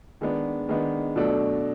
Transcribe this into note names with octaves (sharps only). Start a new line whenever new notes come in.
D#3 G#3 B3 D4
D#3 G#3 B3 D4
B2 F#3 A3 D4